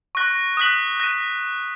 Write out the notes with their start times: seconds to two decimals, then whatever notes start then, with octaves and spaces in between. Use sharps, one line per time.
0.15 C#6 F#6 A#6
0.57 D#6 F#6 B6 F#7
1.00 F#6 A#6 D#7